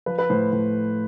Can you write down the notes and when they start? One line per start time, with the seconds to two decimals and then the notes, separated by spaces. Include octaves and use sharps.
0.06 F3 B4
0.19 B4
0.30 A2 C5
0.53 A2